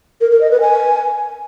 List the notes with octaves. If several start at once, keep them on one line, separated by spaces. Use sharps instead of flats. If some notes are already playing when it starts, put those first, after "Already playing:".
A#4
A#4
D#5
B4
G#5